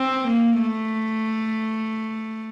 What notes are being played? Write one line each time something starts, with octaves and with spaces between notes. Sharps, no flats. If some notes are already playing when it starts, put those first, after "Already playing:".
Already playing: C4
A#3
A3